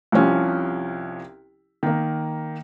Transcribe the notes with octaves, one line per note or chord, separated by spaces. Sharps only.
C2 C3 F3 C#4
D#3 A#3